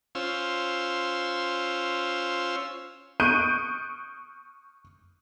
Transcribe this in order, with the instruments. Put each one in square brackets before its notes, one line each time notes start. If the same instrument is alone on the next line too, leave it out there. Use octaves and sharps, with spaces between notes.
[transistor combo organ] C#4 F4 C5 E6
[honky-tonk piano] C#6 D#6 F#6 G6 D7 D#7